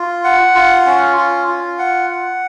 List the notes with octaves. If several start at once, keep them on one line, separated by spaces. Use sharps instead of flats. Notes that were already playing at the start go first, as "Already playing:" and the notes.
Already playing: F4
F#5
F4
C#4
F4
F4
F#5
F#5